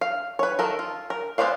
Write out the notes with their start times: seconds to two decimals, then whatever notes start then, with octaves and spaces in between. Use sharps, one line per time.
0.01 F5
0.39 B4 C#5
0.59 D#3 A4 A#4
0.79 F4
1.10 A#4
1.38 G#3 B3 C5 D5 F5